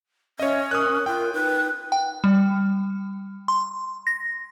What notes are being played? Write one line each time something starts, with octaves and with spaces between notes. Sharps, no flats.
C#4 C#5 D#5 E5
A#4 D#6 F#6
F4 G5
D#4 B4
G5
G3
C6
A#6